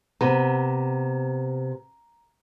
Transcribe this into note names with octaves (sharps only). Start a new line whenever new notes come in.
C3 B3 A#5